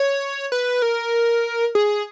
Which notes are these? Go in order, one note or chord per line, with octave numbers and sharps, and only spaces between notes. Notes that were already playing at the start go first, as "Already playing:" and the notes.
Already playing: C#5
B4
A#4
G#4